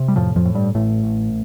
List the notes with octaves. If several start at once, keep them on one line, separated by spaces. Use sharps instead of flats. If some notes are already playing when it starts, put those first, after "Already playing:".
Already playing: C3
G3
F2 A2 F3
F2 F3
A2
G2 G3
A1 A2 A3
A1